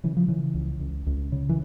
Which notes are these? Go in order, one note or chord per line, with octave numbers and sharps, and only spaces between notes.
C#3 E3
F3
C#3 E3
C#2
C#2
C#2
C#3
E3